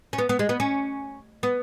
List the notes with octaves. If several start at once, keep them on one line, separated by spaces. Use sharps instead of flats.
C#4
B3
B3
G#3
B3
C#4
B3